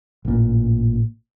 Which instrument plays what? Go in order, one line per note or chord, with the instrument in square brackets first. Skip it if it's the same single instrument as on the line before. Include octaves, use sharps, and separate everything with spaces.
[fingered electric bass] A1 A#2